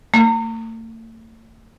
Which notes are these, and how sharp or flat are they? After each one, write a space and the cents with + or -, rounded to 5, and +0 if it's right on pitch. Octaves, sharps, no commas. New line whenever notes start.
A3 +40